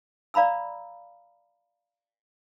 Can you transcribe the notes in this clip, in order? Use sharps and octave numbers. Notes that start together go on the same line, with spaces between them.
D5 F5 A#5 B5 E6